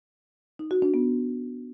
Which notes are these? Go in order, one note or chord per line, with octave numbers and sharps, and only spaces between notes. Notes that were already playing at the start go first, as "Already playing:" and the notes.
D#4
F#4
D4
B3